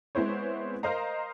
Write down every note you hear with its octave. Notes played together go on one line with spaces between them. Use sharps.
G#3 B3 C4 E4 C5 C#5
A#4 C5 D#5 F5 A#5